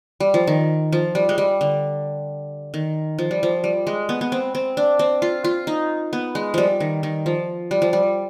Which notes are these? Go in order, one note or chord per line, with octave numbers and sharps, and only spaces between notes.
G3
F3
D#3
F3
G3
G#3
G3
D3
D#3
F3
G3
F3
G3
G#3
B3
B3
C4
C4
D4
C4
F4
F4
D#4
B3
G#3
F3 G3
D#3
D#3
F3
G3
F3
G3